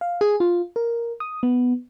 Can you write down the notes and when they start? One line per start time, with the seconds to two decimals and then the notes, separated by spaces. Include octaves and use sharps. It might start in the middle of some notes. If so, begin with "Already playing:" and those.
0.01 F5
0.21 G#4
0.40 F4
0.76 A#4
1.20 D#6
1.43 B3